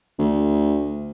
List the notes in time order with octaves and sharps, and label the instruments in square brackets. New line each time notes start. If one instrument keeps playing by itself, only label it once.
[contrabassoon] D2